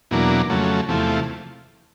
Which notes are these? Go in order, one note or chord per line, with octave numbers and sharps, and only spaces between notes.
E2 B2 F#3 A#3 D4
F2 C#3 F#3 A3
E2 C3 F3 A3